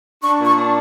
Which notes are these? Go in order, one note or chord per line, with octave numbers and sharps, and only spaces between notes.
D4 C#6
A#2 C#6
D4